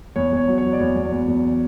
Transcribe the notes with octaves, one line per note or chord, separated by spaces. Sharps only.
E2 C#5
E2 C#5
F#3
C#5
F#3
D5
E2 C#5
E2
E2
E2